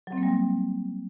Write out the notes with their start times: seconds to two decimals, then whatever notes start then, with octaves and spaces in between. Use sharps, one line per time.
0.07 F#3
0.12 C4
0.18 A#3
0.23 G3